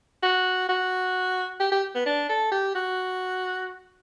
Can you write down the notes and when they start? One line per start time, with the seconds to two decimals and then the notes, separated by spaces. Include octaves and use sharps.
0.23 F#4
0.69 F#4
1.60 G4
1.72 G4
1.95 B3
2.06 D4
2.29 A4
2.52 G4
2.75 F#4